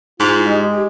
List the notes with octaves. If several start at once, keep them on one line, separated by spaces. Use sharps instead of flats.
G#2 E4 F4
G#3 G4
G4